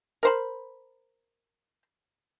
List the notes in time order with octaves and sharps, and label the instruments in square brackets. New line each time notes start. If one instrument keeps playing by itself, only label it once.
[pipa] A#4 C5 B5